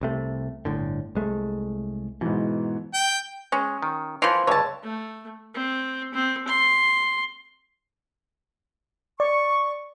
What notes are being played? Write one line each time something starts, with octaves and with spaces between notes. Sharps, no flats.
C2 C3 A3
G1 A2 D3
C2 G#3 A3
G#2 B2 E3
G5
G#3 C#4
D#3
E3 F3 A#4 C#5 C6
C#2 G2 D3 C#5 A5
A3
C4
C4
C6
D5 C#6